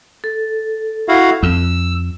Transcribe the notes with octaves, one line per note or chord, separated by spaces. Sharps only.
A4
E4 F#4 F5
F2 E6